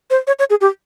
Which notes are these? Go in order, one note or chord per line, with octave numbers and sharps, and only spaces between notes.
C5
C#5
C#5
G#4
G4